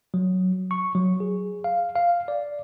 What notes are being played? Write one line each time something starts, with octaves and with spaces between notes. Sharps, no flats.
F#3
C#6
F#3
G#4
F5
F5
D5